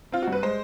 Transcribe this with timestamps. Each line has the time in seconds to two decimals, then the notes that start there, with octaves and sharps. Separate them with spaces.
0.12 C4 F4
0.22 F#4
0.27 G2
0.32 B4
0.43 G#3 C5